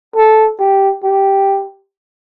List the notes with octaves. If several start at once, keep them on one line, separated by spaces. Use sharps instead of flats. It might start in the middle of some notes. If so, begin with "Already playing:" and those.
A4
G4
G4